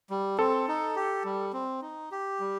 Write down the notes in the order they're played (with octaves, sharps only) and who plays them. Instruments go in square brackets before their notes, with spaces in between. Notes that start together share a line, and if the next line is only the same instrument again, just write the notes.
[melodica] G3
[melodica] C4 [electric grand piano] A4
[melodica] D#4
G4
G3
C4
D#4
G4
G3